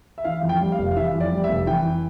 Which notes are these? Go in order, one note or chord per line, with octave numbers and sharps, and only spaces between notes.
E5
E3 F5
F2
G5
G3
F5
F1
F5
E3 E5
F2
D5
G3
E5
F1
E3 G5